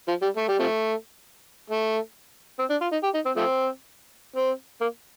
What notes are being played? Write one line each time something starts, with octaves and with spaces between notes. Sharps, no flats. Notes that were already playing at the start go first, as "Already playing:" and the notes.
F3
G3
A3
G3
C3 F3 A3
A3
C4
D4
F4
D#4
G4
D#4
C4
F3 A3 C4
C4
A#3